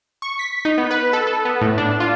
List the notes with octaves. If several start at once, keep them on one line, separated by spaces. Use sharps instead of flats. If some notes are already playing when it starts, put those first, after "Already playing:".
C#6
B6
D#4
B3
B4
A4
A4
B3
A2
D4
F4